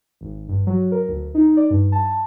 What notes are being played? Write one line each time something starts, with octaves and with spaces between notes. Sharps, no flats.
G#1
G2
F#3
A#4
D2
D#4
D5
G2
A5